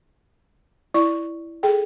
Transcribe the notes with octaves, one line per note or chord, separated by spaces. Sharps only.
E4 D5 C#6
G#4 A4 G5